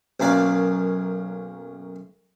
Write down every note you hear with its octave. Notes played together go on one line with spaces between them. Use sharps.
B1 F#2 A#3 D5